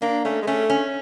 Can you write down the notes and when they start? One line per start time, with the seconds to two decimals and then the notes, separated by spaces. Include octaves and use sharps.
0.02 A#3 D4
0.25 A3 C#4
0.42 G#3
0.47 A3 C#4
0.70 C#4